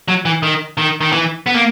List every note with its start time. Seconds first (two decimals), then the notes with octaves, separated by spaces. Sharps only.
0.08 F#3
0.25 E3
0.43 D#3
0.78 D#3
1.01 D#3
1.12 E3
1.46 B3
1.55 A#3